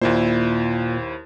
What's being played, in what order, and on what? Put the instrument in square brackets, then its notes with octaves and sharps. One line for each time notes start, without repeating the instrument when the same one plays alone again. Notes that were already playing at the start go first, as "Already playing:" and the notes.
[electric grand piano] D#2 E4 C5 [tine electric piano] A#2